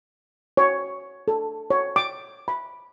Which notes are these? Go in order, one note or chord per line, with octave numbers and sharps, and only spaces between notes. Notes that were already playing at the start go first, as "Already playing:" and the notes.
C#5
A4
C#5
D6
B5